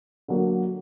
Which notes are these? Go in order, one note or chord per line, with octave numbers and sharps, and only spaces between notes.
D3 F#3 A#3